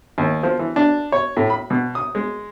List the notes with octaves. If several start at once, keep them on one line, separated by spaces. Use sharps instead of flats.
D#2
F3
E3
D4
C#5
A2
B5
B2
D#6
G#3